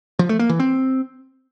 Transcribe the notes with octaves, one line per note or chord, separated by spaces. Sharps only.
F3
A3
A#3
E3
C4